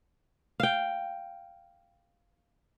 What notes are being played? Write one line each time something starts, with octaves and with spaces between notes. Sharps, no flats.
F5 G5